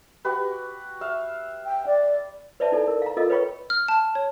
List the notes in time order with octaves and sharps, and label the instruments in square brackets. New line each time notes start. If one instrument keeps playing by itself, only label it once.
[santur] F#4 G4 B4
E5 F5
[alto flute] G5
D5
[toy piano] B4 C5 D5 E5 A5
D#4 E4 A4 D5 G#5
A#4
F5 A#5
F4 A4 A#4 D#5 F5
B4 C#5 F5 G5 B5 C#6
[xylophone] F6
A5
C#5